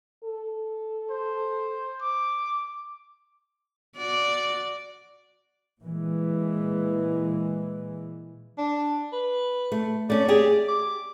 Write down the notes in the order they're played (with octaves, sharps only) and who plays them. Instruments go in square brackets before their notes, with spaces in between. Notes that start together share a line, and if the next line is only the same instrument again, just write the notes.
[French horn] A4
[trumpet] C5
D6
[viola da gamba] F#4 D5
[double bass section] A#2 E3 G#3
[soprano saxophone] D4
B4
[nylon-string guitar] A3
[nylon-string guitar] A3 C#4 [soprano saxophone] D5
[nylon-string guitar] G4 G#4
[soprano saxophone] D6